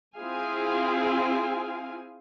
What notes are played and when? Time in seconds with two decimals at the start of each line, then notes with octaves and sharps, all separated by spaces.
0.16 C4 E4 F4 G#4 F5 G#5